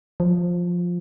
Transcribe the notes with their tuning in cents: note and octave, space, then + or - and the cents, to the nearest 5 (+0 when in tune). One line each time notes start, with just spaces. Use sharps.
F3 +10